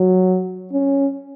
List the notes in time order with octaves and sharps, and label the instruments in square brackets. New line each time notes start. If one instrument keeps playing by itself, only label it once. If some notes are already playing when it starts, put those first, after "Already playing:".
Already playing: [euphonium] F#3
C#4